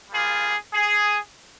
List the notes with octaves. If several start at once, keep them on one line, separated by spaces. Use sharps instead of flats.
G3 A#3 F4 G#4
G#4